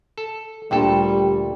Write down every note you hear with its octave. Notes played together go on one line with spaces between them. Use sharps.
A4
D2 A#2 G3 D4 G4 A4 G5